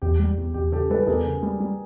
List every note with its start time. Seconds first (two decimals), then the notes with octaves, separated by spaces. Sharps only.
0.02 E2 G4
0.20 G3
0.37 E2
0.54 E2 G4
0.72 C#3 G4 A4
0.90 G3 A4 B4
1.03 A4
1.07 E2 G#4 A#4
1.25 C#3
1.43 G3
1.60 G3